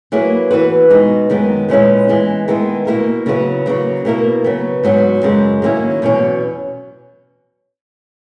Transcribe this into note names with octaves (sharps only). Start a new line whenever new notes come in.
F#3 A#3 E4 G#4 B4
E3 B3 F#4 B4
B2 G#3 D#4
F#2 D#3 G#3 B3
A#2 G#3 C#4 E4 B4
E3 G#3 B3
D#3 G#3 B3 E4
B2 A#3 E4 A#4
C#3 F#3 B3 E4 B4
C#3 F#3 A#3
B2 A#3 E4 A#4
C#3 F#3 B3
G#2 F#3 B3 F#4
F#2 C#3 G#3
D#3 F#3 A#3 C#4 E4
E2 B2 F#3 C#4